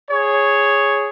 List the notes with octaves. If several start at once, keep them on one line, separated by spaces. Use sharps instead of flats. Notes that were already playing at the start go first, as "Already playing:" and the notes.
G#4 C#5